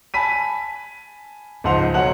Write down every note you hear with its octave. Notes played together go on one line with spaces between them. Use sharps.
G#5 A5 B5 B6 D#7
C#2 G#2 F3 F#5 C6 F7
B1 F#3 F#5 F#6 F#7